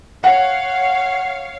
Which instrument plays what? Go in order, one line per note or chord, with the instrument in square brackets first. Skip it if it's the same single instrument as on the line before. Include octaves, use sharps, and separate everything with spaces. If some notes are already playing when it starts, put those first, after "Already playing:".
[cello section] C#5 F5 [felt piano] F#5